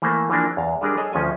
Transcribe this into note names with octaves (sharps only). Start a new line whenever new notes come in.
E3 A3 A#3 C5
E3 F3 A#3 D4
E2 F5
G3 G#3 D4 G#4 A#4 D5
G#4 A4 C#5 D#5
D2 F3 C#4 G#5